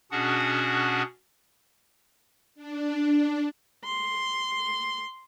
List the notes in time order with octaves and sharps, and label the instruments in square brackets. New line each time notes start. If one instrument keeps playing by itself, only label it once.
[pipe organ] B2 C#4 D4 F#4 G#4 F#5
[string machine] D4
[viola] C6